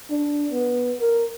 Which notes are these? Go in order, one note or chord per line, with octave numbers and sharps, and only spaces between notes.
D4
B3
A#4